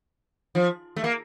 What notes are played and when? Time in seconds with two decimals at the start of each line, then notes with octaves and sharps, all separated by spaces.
0.55 F3
0.96 A3
1.04 A#3